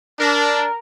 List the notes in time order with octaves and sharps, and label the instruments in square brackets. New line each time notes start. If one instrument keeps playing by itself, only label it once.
[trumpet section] D4 [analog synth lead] A#4